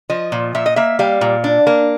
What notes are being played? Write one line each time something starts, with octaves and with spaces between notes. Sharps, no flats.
F3 D#5
A#2
A#2 E5
D#5
A#3 E5
G3 F5
A#2
D4
A#3